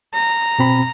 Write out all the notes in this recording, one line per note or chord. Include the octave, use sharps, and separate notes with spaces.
A#5
B2 C4 B5